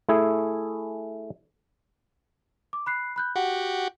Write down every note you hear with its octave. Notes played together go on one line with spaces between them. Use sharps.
A3 E4 G#4 G#5
D6
B5 F#6 C7
B5 F#6 G6
F#4 G4 F#5